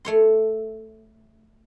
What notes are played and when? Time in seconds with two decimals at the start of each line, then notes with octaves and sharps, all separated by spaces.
0.05 A3 C#5 C6